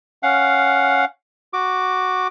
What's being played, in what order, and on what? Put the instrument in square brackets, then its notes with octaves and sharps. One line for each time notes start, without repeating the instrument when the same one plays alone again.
[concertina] C#4 F5 F#5
F#4 D6